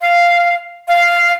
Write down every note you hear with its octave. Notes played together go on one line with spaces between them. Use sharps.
F5
F5